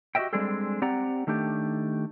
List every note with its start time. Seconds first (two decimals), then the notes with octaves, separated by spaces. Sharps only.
0.15 F#4 G4 A#4 D#5 E5 G5
0.33 G3 G#3 C4 D4 G#4 A4
0.82 C4 G4 D5 F#5 A#5
1.27 D#3 A3 D4 G4